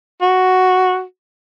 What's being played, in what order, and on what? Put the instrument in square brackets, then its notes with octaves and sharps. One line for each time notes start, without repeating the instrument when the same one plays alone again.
[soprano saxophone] F#4